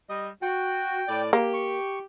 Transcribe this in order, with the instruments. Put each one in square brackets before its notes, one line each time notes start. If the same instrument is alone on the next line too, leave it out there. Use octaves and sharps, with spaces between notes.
[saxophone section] G3 D#5
[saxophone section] F#4 [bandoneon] G5
[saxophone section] A2 D5
[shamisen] A#3 [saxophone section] G4
[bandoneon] C#6